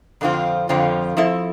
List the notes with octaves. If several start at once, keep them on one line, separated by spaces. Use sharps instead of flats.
F2 D3 F3 C4 F4
F2 D3 F3 C4 F4
F3 C4 E4 A4